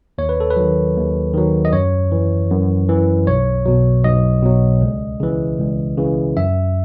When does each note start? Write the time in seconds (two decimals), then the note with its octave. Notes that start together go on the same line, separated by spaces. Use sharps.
0.18 D#2 C#5
0.29 B4
0.40 A4
0.51 B4
0.56 D#3 F#3
0.96 D#2
1.34 D#3 F#3
1.65 D#5
1.73 F#2 C#5
2.12 E3
2.50 F#2
2.89 E3
3.27 B1 C#5
3.66 B2 F#3
4.04 B1 D#5
4.42 B2 F#3
4.81 C#2
5.20 C#3 E3
5.59 C#2
5.97 C#3 E3
6.36 F#2 E5